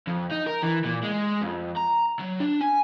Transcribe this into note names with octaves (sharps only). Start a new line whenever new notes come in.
F2
D#4
A#4
E3
A#2
G#3
F2
A#5
F#3
D4
G#5